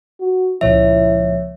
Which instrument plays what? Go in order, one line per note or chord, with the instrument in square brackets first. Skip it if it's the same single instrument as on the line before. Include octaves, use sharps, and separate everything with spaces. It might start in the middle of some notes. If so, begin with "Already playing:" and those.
[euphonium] F#4
[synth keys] C#2 A#2 F3 [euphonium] E4 [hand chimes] C#5 E5